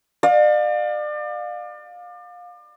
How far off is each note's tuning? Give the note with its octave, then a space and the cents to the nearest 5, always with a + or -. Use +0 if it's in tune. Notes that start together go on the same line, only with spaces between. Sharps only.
D5 +35 F5 +25